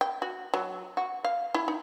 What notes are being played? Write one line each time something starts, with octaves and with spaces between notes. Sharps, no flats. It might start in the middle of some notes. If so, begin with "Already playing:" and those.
G5
F#4
F#3
F#4
F5
E4
D#4